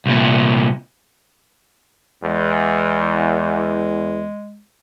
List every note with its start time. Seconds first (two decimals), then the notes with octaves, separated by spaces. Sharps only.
0.06 C2 A#2
2.24 E2 G#3